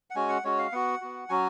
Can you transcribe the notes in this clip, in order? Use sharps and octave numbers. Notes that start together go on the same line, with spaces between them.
F#5
G#3 C#4 F#4 G#5
F#5
G#3 C#4 F#4 C#5
F5
B3 F#4 F#5
B3 F#4
F#3 C#4 F#4 G#5